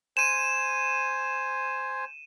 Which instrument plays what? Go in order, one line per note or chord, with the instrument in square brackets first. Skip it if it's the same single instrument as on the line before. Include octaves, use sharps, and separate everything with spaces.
[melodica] C5 G#5 [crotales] D#7 E7